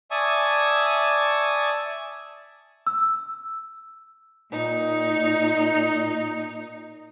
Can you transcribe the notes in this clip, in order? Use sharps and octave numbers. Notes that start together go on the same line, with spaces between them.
D5 E5 G#5 A5 C#6 D#6
E6
A#2 D#4